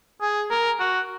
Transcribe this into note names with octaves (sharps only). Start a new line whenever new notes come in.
G#4
A#4
F#4